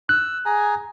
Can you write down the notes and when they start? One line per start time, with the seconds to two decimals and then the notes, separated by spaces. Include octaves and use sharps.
0.09 E6 F#6
0.45 G#4 G#5 A#5